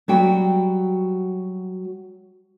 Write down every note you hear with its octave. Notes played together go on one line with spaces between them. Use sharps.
F#3 G3 F#4 G5